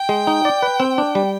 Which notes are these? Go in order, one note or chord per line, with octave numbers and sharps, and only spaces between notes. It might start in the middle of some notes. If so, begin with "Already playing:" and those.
Already playing: G5
G#3
D#4
D5
B4
C4
D4
G3